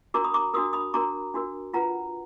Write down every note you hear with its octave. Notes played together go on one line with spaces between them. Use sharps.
D4 F#4 A#4 A#5 D6
B5 D#6
A#5 D6
D4 F#4 A#4 D#6
B5 D#6
D4 F#4 A#4 A#5 D6
D4 F#4 A#4
F4 B4 F#5 A#5